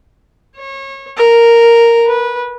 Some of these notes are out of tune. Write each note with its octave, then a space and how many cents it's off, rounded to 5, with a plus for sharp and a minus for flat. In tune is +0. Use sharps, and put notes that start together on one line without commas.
C#5 -30
A#4 -5
B4 -20